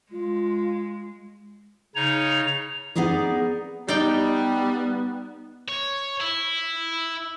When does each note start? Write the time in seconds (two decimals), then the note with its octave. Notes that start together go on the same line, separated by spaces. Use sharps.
0.12 G#3 F4
1.95 C#3 D#4 C#5 F7
2.95 B3 D#4 G#4 A#4 D5
3.88 G3 B3 D#4 D5 G5
5.69 C#5
6.21 E4